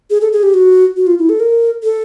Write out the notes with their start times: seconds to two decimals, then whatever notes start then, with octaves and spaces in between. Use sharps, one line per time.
0.10 G#4
0.21 A4
0.32 G#4
0.43 G4
0.54 F#4
0.97 F#4
1.07 F4
1.19 E4
1.29 A4
1.40 A#4
1.83 A4